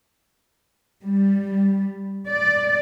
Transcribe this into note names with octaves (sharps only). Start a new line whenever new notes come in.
G3
D5